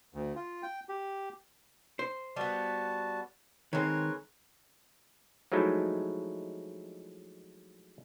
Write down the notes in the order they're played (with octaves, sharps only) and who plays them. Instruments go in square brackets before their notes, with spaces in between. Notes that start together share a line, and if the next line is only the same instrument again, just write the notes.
[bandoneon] D2
F4
G5
G4
[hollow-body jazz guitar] C5
[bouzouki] G3 B3 [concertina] F#4 A5
[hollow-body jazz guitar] D#3 C4 [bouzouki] G#3 C#5 [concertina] A#4 B4
[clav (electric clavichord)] F3 F#3 G#3 A3 D#4 E4